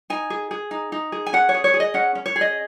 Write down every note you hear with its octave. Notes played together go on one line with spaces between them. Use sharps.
D#4 G#5
G#4
G#4
D#4
D#4
G#4
G#5
C#4 F#5
C#5
G#4
C#5
G#4
D#5
C#4 F#5
C#4
C#5
G#4
D#5